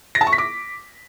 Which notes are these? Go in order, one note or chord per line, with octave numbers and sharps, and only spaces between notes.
A#6
A5
C#6
B6
D6